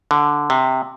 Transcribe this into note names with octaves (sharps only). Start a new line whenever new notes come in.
D3
C3